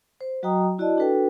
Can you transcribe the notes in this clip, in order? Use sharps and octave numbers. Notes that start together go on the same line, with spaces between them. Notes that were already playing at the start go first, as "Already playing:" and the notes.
C5
F#3 F#4 D#5 G5 A#5 D#6
E4 F#4 D5 D#5 A5
D4 F#4 A4 B4 G5